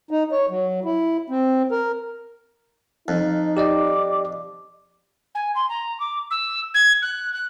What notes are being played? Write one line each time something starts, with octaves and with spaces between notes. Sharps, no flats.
D#4
C#5
F#3
E4
C4
A#4
F2 D#4
G4 D5 D#5 D6
G#5
C6
A#5
D6
E6
G#6
F#6
F#6